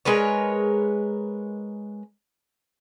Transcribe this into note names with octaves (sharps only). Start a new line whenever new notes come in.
G#3 A#4 B4 C#5